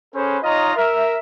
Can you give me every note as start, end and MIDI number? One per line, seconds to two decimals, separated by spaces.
0.14 0.36 61
0.14 0.36 68
0.14 0.36 69
0.14 0.36 71
0.14 0.36 72
0.43 0.72 63
0.43 0.72 65
0.43 0.72 73
0.43 0.72 75
0.43 0.72 82
0.75 1.17 70
0.75 1.17 76